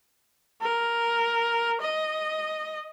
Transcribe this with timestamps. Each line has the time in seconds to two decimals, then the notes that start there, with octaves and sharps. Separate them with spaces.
0.62 A#4
1.81 D#5